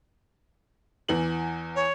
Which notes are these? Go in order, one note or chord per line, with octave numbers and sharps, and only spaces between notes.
E2 E3 F#7
C#5